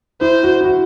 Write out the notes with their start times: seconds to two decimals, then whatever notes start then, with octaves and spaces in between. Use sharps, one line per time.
0.21 E4 C5
0.43 F#4
0.61 E4
0.64 F#4